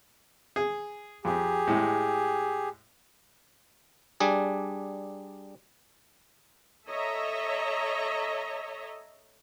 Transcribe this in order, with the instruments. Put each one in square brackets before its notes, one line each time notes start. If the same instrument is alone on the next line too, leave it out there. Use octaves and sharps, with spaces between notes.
[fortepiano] G#4
[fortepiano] F2 [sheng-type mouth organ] G4 G#4
[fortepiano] A2 G#3
[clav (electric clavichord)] G3 D4 G#4
[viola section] A4 C#5 D#5 E5 A#5